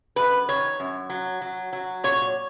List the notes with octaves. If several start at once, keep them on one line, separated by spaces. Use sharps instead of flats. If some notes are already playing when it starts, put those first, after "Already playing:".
F#2 B4
D#3 C#5
F#2
F#3
F#3
F#3
A#2 C#5